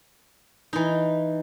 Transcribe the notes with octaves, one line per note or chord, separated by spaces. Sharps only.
E3 D#4